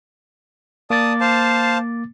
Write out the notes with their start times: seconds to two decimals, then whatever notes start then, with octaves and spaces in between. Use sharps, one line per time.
0.90 A#3 D5 A5 D6 D#6 A6
1.21 C5 F5 A5